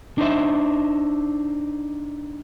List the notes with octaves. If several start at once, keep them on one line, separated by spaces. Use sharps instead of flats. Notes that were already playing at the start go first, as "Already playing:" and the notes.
D4 D#4 C5 E5